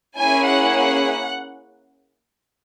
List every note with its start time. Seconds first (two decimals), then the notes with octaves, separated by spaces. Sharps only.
0.17 A#3 C#4 E4 G#4 G#5
0.46 F#5